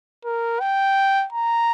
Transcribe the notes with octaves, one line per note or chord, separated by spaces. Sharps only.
A#4
G5
A#5